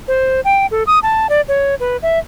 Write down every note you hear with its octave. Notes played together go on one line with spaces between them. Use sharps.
C5
G5
A4
D#6
A5
D5
C#5
B4
E5